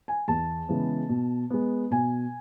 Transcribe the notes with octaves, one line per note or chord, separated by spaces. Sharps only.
G#5
E2 A5
C#3 E3 G#3 B3
B2
G#3 B3
B2 G#5